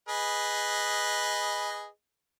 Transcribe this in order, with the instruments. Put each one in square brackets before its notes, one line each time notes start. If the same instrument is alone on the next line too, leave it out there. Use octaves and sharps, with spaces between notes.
[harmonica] G#4 B4 D#5